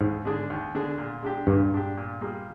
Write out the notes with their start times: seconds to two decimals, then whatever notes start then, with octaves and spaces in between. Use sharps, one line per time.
0.01 D#2 G#2
0.25 D3 G#3 D4 G#4
0.50 D#2
0.75 D3 G#3 D4 G#4
0.98 A#2
1.23 G#3 D4 G4
1.47 G2 A#2
1.72 G#3 D4 G4
1.97 A#2
2.21 G3 A#3 F4 G#4